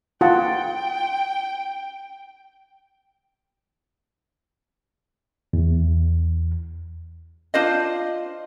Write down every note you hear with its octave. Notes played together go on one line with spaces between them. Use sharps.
F4 F#5 G5 A5
E2
D4 F4 C5 D#5